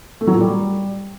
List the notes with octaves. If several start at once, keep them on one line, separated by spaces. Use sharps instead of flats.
A3
F#3
A#2
G3